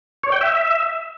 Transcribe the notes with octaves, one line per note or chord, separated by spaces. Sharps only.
C#5
G5
E5